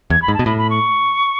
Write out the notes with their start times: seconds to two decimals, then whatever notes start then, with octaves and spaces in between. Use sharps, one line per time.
0.10 E2 G#6
0.22 B5
0.28 G#2
0.34 A5
0.39 B2
0.46 A2 B5
0.58 B5
0.70 C#6